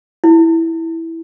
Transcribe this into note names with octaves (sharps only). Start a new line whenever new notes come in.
E4